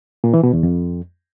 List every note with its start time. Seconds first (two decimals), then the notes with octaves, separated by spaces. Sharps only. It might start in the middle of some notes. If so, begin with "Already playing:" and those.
0.24 A#2
0.34 E3
0.43 B2
0.53 E2
0.63 F2